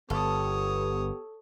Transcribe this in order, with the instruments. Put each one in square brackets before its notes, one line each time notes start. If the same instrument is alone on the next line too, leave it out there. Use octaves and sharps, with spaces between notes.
[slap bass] G1 [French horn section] B3 G4 [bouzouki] A4 [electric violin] C#5 D#6